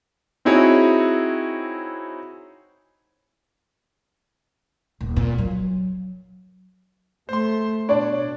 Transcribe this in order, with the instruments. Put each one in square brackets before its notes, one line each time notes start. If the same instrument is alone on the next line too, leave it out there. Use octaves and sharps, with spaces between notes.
[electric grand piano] C4 D#4 E4 F#4 G#4 C#5
[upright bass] D#1
A#2
F#3
[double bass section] A3 [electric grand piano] C5 C6
[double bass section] B2 [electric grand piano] D4 D5 A5 [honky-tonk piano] C#5